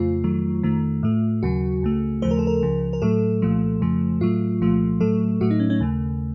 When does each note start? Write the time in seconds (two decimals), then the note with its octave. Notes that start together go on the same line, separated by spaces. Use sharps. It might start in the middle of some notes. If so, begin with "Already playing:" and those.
Already playing: F2 C#3 A3 F4
0.24 F2 D#3 F#3 A3
0.63 F2 D#3 A3
1.03 A2 A3
1.43 D#2 C#3 F#3 F#4
1.82 C#2 C#3 A3
2.22 D#2 C#3 F3 A3 C5
2.31 A#4
2.39 A4
2.47 A#4
2.62 C#2 C#3 F3
2.93 A#4
3.02 A2 F#3 A3 A4
3.42 C2 A#2 F3 A3
3.81 F2 C#3 F3 A3
4.21 A2 F#3 A3 F4
4.61 C2 A#2 F3 A3
5.00 A2 F#3 A3 A4
5.41 A2 F#3 A3 F#4
5.51 D#4
5.60 C#4
5.70 C#4
5.80 D#2 C#3 A3